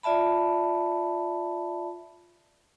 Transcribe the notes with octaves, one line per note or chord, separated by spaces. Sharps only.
F4 D5 E5 A5 B5